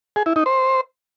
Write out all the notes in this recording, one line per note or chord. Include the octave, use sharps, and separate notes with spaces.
G#4
E4
D#4
C5